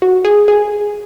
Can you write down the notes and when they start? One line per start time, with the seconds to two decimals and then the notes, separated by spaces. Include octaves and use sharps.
0.02 F#4
0.25 G#4
0.48 G#4